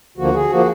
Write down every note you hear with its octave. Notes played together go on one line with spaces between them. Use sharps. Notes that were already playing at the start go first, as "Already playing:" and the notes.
D2 D3 F3 A#3 F#4
G#4
F3 A#3 F#4